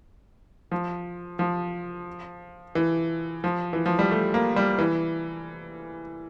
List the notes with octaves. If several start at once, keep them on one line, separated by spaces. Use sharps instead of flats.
F3
F3
E3
F3
E3
F3
G3
A3
A#3
G3
E3